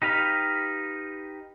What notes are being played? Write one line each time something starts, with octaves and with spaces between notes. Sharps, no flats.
D#4 G4 B4 F5